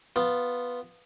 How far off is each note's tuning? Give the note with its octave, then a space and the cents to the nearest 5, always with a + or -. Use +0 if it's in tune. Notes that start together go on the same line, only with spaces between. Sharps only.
B3 +0 F4 +0